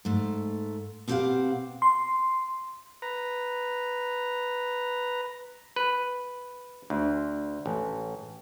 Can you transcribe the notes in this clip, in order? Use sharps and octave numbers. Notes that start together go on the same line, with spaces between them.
G#2 A3
B2 C4 G4 A#4 F5 F#5
C6
B4 A#5
B4
D2
A1